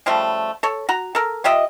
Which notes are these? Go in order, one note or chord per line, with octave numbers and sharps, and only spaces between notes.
C#3 F3 G3 A3
A4 C#5
F#4 A#5
A4 A#4
F4 G4 D#5 E5